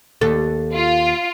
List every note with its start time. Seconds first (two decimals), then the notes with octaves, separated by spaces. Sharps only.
0.21 D#2 A4
0.74 F4